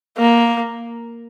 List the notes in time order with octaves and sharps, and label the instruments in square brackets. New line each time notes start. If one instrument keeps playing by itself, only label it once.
[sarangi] A#3